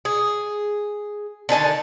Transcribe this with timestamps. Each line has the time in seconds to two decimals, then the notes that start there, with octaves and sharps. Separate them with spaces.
0.05 G#4
1.49 D3 D#3 G#5 A5